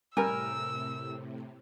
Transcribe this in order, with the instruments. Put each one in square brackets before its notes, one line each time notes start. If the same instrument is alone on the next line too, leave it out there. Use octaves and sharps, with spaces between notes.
[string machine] A2 C3 [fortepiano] G3 A#4 [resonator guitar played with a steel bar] G#5 [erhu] E6